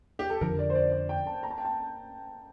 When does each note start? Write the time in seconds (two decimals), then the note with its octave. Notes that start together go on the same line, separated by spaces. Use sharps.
0.19 G4
0.30 A4
0.41 F2 D3 F3 A#4
0.59 D5
0.70 C5
0.75 D5
0.92 D5
1.09 G5
1.27 A5
1.43 A#5
1.51 A5
1.58 G5
1.65 A5